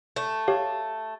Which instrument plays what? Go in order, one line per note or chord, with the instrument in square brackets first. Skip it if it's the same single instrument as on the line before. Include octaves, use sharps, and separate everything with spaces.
[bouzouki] A3
[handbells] G4 C#5 F5